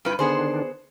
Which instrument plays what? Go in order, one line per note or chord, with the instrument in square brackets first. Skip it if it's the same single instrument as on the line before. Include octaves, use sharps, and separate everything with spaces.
[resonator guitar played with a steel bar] G2 B4 [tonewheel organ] E4 F4 G5
[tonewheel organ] D3 D#3 D4 [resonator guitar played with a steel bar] B3 G#4 C5